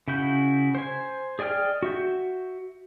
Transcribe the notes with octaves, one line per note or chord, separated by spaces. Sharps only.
C#3 E4 F#4 G6
C5 G#5
G#4 D5 D#5 G5 F6
F#4 E5 G6